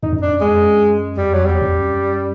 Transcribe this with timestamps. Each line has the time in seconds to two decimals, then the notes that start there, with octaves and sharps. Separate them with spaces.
0.03 F2 D#4
0.13 F#2
0.22 F2 D4
0.32 F#2
0.41 F2 G#3
0.60 F#2
1.17 F2 G3
1.34 F#3
1.46 E2 G3
1.62 F2
1.74 F#2